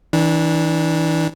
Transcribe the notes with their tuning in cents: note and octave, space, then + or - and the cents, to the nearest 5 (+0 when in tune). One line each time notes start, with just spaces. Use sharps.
E3 -30 D4 +0